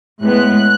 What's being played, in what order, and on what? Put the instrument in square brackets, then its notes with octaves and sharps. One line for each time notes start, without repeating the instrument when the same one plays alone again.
[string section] A2 G#3 B3 F#6